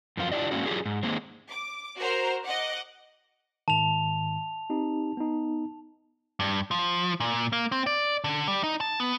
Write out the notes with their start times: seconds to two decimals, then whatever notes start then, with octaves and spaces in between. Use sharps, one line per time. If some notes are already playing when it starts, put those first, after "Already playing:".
0.17 F#2 F3 F4
0.31 D4 E4 F4 G4 D5 D#5
0.51 G#2 D#3 A#3 C#4 F#4
0.66 F#3 D4 F4 G4 G#4
0.86 G#2
1.03 D#3 G#3 A#3 C4
1.49 D6
1.98 F#4 A#4 C5 A#5
2.44 D#5 F#5 D6
3.68 G#2 D#3 A5 F7
4.70 C4 D#4 G4
5.17 B3 D#4
6.40 G2
6.71 F3
7.20 A#2
7.53 A#3
7.72 C4
7.87 D5
8.24 D3
8.48 G3
8.63 D#4
8.80 A5
9.00 B3